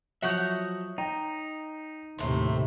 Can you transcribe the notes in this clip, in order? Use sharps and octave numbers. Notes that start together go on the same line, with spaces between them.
F3 F#3 C#5 D#5 E5 F#5 G6
D#4 G5 A#5
D#2 A2 C3 A3 C5 C6